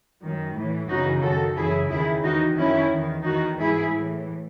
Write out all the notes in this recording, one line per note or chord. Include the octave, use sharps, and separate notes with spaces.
F#2 D#3
A2 E3
F#2 C#3 E3 D#4 F#4
F#2 D#3 F#4 A4
F#2 C#3 E3 E4 G#4
E2 D#3 E4 G#4
E2 D#3 D#4 F#4
F#2 D#3 C#4 E4
E2 D#3
E2 D#3 D#4 F#4
G#2 E3 E4 G#4
A2 E3